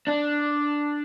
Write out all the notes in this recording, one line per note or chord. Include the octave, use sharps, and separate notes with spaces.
D4